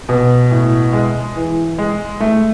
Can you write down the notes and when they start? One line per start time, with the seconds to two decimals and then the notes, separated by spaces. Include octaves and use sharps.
0.09 B2
0.51 A2
0.93 G#3
1.36 E3
1.78 G#3
2.20 A3